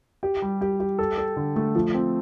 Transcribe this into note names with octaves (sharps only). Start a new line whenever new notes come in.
G4
G3
G4
G4
A4
A4
D3
A3
F3
C4